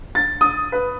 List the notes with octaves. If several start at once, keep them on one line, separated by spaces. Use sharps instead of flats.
A6
D#6
B4